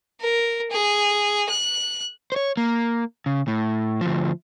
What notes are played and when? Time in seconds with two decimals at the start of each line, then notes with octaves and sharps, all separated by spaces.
0.21 A#4
0.71 G#4
1.49 F#6
2.32 C5 C#5
2.57 A#3
3.26 C#3
3.48 A2
4.01 D2 F3